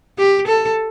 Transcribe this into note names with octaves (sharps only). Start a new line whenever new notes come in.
G4
A4